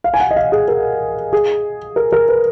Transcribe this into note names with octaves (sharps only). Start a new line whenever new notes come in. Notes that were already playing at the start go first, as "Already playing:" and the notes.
F5
G#5
F#5
D#5
F5
G#4
A#4
G#4
A#4
A#4
B4